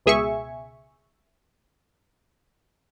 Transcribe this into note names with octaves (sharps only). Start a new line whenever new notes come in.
C#2 B2 G#4 E5 G#5 C#6